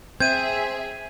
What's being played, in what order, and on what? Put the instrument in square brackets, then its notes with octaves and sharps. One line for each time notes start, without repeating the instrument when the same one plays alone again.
[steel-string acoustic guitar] C4 [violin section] G#4 E5 [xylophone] G6 [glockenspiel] G#6 D#7